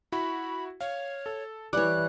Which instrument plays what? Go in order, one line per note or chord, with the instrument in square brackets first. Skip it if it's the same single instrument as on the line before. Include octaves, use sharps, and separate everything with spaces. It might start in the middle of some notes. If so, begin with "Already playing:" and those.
[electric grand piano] E4 F#4 [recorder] B5
[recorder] C#5 [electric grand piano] F5
[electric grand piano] A4
[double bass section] E3 [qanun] G3 C#5 [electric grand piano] D6 [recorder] F#6